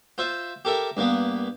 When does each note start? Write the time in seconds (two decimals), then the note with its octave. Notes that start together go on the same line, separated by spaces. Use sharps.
0.18 F4 C5 E5
0.65 G4 A4 A#4 E5
0.97 G2 A#3 B3